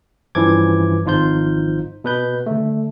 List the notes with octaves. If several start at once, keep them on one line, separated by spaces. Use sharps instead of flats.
G2 E3 F3 C#4 D6 G#6
G#1 F3 D#4 F4 C5 G6
B2 B4 G6
D3 A3